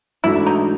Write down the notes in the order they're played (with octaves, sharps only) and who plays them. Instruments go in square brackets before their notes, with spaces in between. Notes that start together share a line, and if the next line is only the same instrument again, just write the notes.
[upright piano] G#2 E3 A3 D4 F#4 [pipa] E4
[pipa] D#4